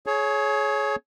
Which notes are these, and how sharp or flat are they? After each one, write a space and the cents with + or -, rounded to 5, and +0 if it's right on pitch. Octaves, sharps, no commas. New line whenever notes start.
G#4 +30 C#5 +0